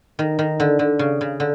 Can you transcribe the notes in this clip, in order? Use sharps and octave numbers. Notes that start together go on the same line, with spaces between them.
D#3
D#3
D3
D3
C#3
C#3
D3